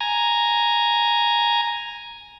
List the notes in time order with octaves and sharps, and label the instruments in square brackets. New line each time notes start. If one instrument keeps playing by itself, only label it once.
[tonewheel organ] G#5 A#5